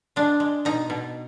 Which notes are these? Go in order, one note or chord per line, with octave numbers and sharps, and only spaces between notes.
G#3 D4
G#3
B2 D#4
B2